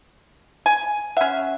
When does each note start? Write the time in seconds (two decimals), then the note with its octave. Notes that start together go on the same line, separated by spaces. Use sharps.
0.66 G#5
1.17 C#4 E5 F#5